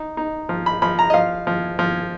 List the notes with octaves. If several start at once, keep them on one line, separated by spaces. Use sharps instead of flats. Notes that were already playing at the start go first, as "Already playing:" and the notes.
Already playing: D#4
D#4
F3
B5
F3 B5
A#5
D#5
F3 F5
F3
F3